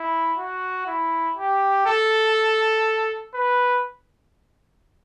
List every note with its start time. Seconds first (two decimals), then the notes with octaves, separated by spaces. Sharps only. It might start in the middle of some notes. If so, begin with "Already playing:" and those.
Already playing: E4
0.38 F#4
0.87 E4
1.37 G4
1.86 A4
3.34 B4